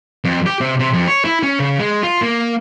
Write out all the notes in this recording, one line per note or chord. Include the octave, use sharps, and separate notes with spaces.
F2
G4
C3
C3
F2
C#5
E4
C#4
C#3
G#3
F4
A#3